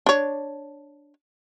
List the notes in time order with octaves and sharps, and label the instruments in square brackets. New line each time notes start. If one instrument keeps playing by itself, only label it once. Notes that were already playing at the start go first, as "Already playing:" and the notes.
[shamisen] D4 C#5